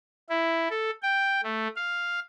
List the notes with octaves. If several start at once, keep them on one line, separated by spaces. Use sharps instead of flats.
E4
A4
G5
A3
F5